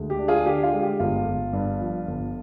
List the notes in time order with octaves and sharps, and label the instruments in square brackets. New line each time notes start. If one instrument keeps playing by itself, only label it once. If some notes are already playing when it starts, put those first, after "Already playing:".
Already playing: [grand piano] D2 G#3
G4
D4
F4 G#4
D3 G4
F4
G#3
G4
G1 F4
G1
G2
F3
G1